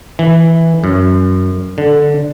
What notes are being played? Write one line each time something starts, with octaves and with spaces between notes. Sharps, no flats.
E3
F#2
D3